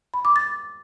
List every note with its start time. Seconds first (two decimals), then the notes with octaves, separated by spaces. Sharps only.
0.14 B5
0.25 D6
0.36 A6